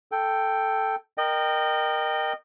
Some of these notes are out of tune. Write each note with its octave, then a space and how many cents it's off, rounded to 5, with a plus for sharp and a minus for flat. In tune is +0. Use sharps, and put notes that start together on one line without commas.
A4 +0 G5 +0
A#4 +0 D#5 -25 G5 +0